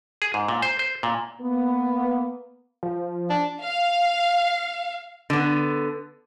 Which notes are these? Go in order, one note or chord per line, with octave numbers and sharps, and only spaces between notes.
G#4
G#2
A#2
C5
C5
A#2
A#3 B3
F3
D4
F5
D3 B3